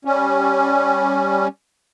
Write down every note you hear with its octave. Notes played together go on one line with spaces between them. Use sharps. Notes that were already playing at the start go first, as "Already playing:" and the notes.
G3 C#4